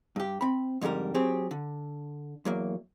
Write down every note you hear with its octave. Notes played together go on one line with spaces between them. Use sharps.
G2 G4
C4 B5
F2 G#2 D3 G3 A#4
F#3 C4 G4 G#4
D3
E2 F#3 A#3